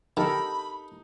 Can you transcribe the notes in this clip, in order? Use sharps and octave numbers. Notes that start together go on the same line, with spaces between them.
D#3 D#4 G4 A4 A#4 B5